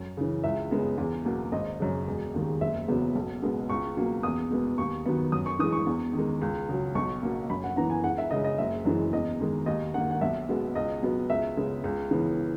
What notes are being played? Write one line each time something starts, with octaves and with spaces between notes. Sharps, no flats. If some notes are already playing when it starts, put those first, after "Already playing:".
Already playing: F#2
C#3 E3
C#2 E5
C#3 G#3 B3
E2
B2 F#3 A#3
G#1 D#5
F#2 C#3
E1
D#2 D#3 G#3
F#1 E5
E2 C#3 F#3 B3
B1
B2 G#3 B3
C#2 C#6
B2 F#3 A#3
E2 D#6
B2 G#3 B3
D#2 C#6
D#3 F#3 B3
F#2 D#6
C#6
E3 G#3 D#6
C#6
E2
D#3
G#3
C#2
C#3 F#3
B1 C#6
B2 A#3
F#2 B5
F#5
E3 B3 A#5
G#5
C#2 F#5
E5
C#3 G#3 D#5
D#5
F#1 E5
F#2 E3 G#3
E2 D#5
D#3 G#3
D#2 D#5
D#3 A#3 F#5
F#5
B1 E5
B2 G#3 B3
C#2 D#5
B2 F#3 B3
C#2 E5
C#3 G#3 B3
C#2
C#3 E3 B3